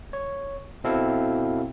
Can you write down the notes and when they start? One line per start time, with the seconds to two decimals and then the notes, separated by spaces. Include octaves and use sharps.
0.13 C#5
0.84 B2 C4 E4 A4 F5